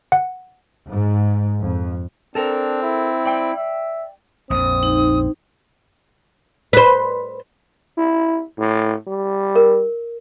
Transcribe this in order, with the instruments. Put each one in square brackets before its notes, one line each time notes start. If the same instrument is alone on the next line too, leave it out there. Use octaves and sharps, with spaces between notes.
[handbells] F#5
[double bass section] G#2
F2
[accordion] C4 [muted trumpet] D4 [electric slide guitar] A4 A#4
[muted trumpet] E4
[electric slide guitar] D5 G5
[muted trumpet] E5
[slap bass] A#1 F2 [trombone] C4 [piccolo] D#6
[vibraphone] D#4
[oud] B4 C5
[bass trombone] E4
A2
G3
[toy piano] A#4